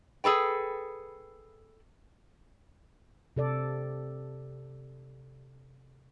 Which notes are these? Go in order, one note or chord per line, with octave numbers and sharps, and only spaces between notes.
G#4 A4 B4 G5
C3 A4 D5